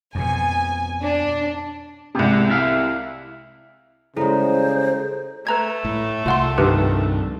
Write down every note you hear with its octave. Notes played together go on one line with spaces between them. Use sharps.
F2 B2 G#5
D4
C2 C3 G#3 B3 G4
E4 E5 F5
C#3 G3 G#3 E4 A4 C5 A#5
A3 B4 A#5 G#6
A2
C2 F4 F#5 C6
G2 D#3 G4 B4